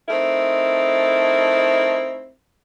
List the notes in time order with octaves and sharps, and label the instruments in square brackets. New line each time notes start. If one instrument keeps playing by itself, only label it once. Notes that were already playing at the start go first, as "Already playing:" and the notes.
[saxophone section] A3 C4 D#4 E4 A#4